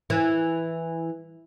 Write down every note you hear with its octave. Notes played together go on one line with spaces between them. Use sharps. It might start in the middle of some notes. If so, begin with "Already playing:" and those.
E3